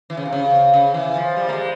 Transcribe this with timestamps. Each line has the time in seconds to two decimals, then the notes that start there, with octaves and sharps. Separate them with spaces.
0.10 E3
0.17 C#3
0.26 C3
0.33 C#3
0.74 C#3
0.94 E3
1.16 F3
1.37 G3
1.49 A#3
1.53 G#3